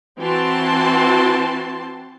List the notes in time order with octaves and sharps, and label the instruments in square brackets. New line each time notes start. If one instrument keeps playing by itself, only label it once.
[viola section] E3 C4 F#4 A5 C6